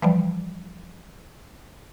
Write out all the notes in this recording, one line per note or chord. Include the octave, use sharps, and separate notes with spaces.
E3 F3 G3